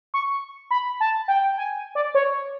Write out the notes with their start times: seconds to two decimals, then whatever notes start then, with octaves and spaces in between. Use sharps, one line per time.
0.14 C#6
0.71 B5
1.00 A5
1.28 G5
1.58 G#5
1.95 D5
2.15 C#5